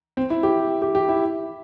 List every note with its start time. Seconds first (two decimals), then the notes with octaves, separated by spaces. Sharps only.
0.17 C4
0.30 E4
0.43 G4
0.82 G4
0.95 G4
1.08 E4